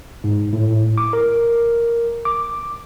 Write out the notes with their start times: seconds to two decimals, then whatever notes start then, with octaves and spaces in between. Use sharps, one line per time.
0.24 G#2
0.53 A2
0.98 D6
1.13 A#4
2.25 D6